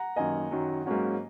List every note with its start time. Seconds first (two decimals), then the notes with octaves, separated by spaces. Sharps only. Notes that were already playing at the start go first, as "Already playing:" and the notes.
Already playing: F#5 A#5
0.16 F#2 D#3 A#3 D#5 G#5
0.51 F#2 D#3 F#3
0.86 G#2 F#3 A#3 C#4 F#4